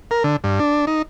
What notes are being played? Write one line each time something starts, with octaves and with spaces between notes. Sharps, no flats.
A#4
D3
G2
D4
D#4